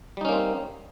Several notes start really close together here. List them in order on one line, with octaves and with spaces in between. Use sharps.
G3 D#4 C#4 A#3 C4